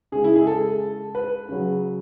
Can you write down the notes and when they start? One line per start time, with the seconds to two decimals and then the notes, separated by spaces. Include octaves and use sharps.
0.12 C#3 G#3 G#4
0.24 E4
0.36 G#4
0.47 A4
1.15 B4
1.49 C#3 F#3